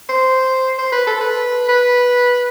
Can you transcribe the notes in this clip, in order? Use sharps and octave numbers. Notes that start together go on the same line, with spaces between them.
C5
C5
B4
A4
B4
B4